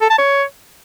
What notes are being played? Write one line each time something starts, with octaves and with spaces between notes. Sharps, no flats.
A4
A5
C#5